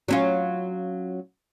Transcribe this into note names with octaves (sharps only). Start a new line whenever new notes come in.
F#3 C#4 F4